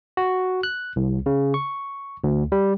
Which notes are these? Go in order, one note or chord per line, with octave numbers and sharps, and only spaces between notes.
F#4
F#6
C2
C#3
C#6
D2
G3